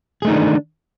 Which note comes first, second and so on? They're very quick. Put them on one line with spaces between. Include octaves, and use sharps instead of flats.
G#4 A3 D#4 D#3 D4